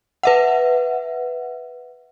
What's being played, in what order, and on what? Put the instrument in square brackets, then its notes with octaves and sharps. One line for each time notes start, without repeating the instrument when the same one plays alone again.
[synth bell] B4 E5 F#5